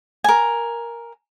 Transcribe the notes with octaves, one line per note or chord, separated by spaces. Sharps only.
A#4 G#5